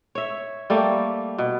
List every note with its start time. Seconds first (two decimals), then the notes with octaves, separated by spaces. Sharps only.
0.15 C#5 E5
0.70 G3 A3 A#3 G4
1.38 B2